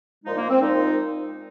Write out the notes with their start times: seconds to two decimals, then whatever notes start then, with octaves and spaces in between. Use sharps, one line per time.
0.24 A#2 F3 G#3 D#4
0.37 A#3
0.49 C4
0.61 A#2 F3 G#3 D#4